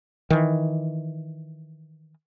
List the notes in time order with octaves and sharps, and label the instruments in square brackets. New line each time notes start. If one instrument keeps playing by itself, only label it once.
[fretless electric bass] D#3 E3